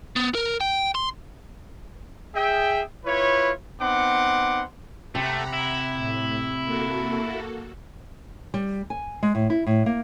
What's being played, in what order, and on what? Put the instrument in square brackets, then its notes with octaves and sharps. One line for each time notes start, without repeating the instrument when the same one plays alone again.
[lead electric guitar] B3
A#4
G5
C6
[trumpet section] G#4 E5 G5
E4 F4 B4 C#5
B3 C4 D#4 F#5 C6 D6
[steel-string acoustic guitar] C3 [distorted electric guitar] A3 [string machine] F#5 A#5 B5
[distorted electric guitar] E4
[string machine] A2
A#3 F#4 A4
[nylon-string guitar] G3
G#5
G#3
A2
E4
A2
A#3